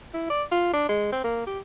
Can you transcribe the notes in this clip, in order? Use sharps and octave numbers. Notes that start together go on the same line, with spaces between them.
E4
D5
F4
D4
G#3
C4
A#3
G4